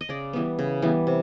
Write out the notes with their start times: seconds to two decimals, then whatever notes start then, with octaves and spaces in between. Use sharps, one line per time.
0.01 D#5
0.09 C#3 D5
0.33 E3 G3 B3
0.59 C#3
0.82 E3 G3 B3
1.07 C3